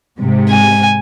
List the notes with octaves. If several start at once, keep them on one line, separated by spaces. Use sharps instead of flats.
G#2 C3
G#5